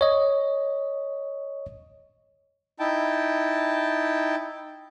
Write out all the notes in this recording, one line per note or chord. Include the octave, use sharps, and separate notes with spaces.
C#5 D#5
D#4 E4 G5 A5